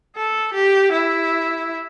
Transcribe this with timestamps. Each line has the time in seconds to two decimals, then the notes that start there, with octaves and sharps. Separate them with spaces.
0.16 A4
0.54 G4
0.92 E4